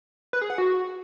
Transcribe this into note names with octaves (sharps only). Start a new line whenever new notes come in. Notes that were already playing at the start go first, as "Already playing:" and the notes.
B4
G#4
F#5
F#4